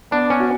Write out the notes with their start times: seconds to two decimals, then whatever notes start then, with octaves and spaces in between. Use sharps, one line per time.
0.11 B3 D4
0.30 C#4
0.40 F#4